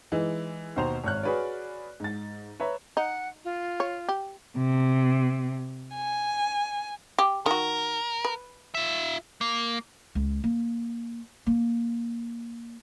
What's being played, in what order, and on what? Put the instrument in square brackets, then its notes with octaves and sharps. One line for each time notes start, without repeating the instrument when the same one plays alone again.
[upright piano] E3 G#3 D#4
D#2 B2 C5 A#5 F7
G#1 C#5 F6 F#6
F#4 G#4 B4 C#5 D5
G#2 A6
B4 C#5 E5 A#5
[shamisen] D#4 [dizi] F#5
[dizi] F4
[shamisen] C#5
G4
[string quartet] C3
G#5
[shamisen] G4
[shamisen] D#3 F#4 [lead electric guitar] A#4
[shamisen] B4
[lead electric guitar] F4 E5
A#3
[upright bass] C#2
A#3
A#3